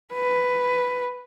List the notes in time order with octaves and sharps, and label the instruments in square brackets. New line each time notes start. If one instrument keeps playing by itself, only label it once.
[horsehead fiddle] B4